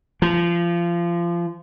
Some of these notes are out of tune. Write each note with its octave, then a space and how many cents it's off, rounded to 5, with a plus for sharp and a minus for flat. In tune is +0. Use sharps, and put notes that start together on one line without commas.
F3 -25